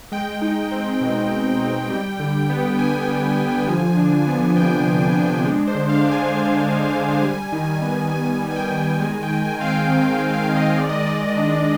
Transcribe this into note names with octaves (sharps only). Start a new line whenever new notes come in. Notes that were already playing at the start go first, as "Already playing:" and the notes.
G#3 G5
D#4
C4
B2
G#3
D#4
G3
D3
B3
D3 G#5
G3
D3
F3
D4
B3
C3 G5
F3
D4
G#3
C5
D3
F5
D4
G#5
D3
G#3
D3
G3
D#3
B3
D#3 G#5
G#5
G3
G#5
G5
D#3
G5
G#3 G#5
G5
D#3
G#5
C4 F5
G5
D#3 G5
G5
G#3
F5
D#3
D#5
G#3 D5
D#5
D5
D#3
D4